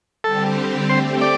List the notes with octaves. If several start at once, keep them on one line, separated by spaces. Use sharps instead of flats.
D3 G3 C4 G4 A4
A3 C4 G4 C5
D5